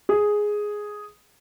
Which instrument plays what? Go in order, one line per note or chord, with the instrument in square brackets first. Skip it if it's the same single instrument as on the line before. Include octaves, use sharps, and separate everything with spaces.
[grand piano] G#4